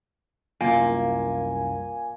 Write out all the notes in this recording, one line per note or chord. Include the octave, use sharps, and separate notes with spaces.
C2 F#2 A#3 F4 G#5